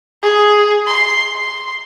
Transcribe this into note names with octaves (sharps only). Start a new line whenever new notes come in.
G#4
C6
C6